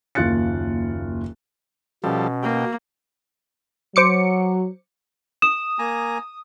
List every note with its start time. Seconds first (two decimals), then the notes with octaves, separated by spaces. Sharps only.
0.15 F#1 D#2 F4 F#6 A6 C#7
2.04 B2 F3 G3 C#4 A4
2.43 A#3 G5
3.96 F#3 C5 D6 C#7
5.42 D#6 E7
5.79 A#3 G#5 A#5